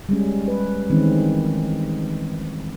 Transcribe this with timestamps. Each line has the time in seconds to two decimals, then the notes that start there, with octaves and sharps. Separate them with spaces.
0.09 G3 G#3 C#4
0.48 B4
0.90 D#3 E3 G#3 C4 C#4